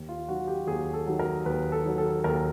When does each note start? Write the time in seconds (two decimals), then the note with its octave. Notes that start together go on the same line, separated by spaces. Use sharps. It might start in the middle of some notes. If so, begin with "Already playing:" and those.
Already playing: D#2
0.09 F4
0.28 D#3 F#3 F#4
0.48 G4
0.67 D#2 G#4
0.93 A4
1.07 D#3 F#3
1.19 A#4
1.46 D#2 B4
1.72 A4
1.85 D#3 F#3
1.98 A4
2.24 D#2 A#4